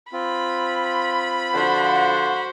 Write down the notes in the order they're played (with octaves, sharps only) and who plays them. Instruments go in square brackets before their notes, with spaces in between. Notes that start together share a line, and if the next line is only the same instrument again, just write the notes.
[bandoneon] C4 F4 [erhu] B5
[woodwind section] D3 F3 F#5 [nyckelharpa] F#4 C5